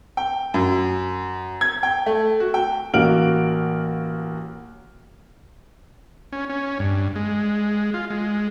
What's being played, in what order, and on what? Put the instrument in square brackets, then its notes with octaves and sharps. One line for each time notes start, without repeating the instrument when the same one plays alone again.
[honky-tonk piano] G5
F#2
G#6
G5
A3
F#4
G5
[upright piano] A1 A#3 F#4 F6 D7 F#7
[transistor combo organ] C#4
C#4
G2
G#3
F4
G#3